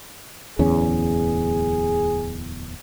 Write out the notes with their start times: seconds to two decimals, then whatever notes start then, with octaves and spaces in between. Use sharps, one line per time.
0.59 D1 E2 C#4 G#4